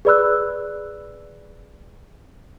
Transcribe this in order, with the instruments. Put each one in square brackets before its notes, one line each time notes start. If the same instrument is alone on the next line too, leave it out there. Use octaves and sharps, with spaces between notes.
[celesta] G#4 B4 D5 B5 E6 F#6